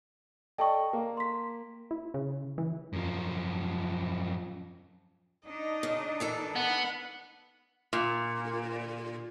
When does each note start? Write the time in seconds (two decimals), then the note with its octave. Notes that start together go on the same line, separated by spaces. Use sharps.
0.58 A4 D5 D#5 G5 A5 C#6
0.93 A#3
1.17 C6 B6
1.91 E4
2.14 C#3
2.58 E3
2.93 F#2 F3
5.48 D4 D#4 D#5
5.83 C#3
6.20 D#3 E3 A4
6.56 B3 F#5
7.93 A#2